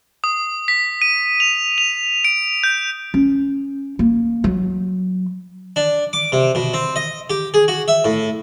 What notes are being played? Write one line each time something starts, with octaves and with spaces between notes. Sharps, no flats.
D#6
B6
D#7
F7
F7
D7
G6
C#4
A#3
F#3
D4
D6
C3
B2
C4
D#5
G4
G#4
F#4
E5
A2